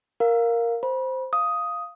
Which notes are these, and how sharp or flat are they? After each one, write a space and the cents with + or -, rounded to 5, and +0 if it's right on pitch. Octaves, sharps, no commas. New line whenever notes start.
A#4 +0 F5 +5
C5 +0 B5 -30
F5 -5 D#6 +5